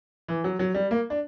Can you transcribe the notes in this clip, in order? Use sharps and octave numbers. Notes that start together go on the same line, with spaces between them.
E3
F#3
F#3
G3
A#3
D4